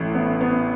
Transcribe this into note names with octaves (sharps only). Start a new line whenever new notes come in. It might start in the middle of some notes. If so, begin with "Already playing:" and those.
Already playing: A1 A2
B3
B3